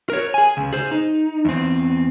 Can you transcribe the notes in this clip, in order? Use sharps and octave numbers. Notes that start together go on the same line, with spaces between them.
A#4 C#5
G#4 G#5
C#2
G#4 C5
D#4
E2 C4